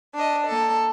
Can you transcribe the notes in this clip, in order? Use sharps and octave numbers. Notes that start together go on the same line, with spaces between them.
D4 D#5
A#3 A4